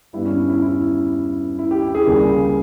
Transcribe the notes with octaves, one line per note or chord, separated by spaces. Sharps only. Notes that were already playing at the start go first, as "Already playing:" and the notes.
G2 G3 B3 E4
C#4
E4
E4
E4
G4
E4
G#4
C#2 C#3 G3 A#3